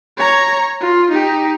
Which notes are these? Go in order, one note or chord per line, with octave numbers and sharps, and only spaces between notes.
C#5 A#5
F4
D#4 G4